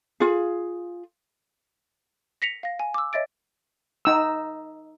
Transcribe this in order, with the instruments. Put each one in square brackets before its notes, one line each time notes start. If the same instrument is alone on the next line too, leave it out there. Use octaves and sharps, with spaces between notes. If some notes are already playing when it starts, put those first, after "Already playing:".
[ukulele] F4 G#4
[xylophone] A#6 B6 C#7 F7
F5 A#6
G#5
D6 E6
C#5 D#5 E5 A6 D7
[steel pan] D#4 E6